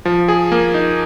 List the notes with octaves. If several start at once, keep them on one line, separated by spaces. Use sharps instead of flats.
F3
G#4
A#3
D#4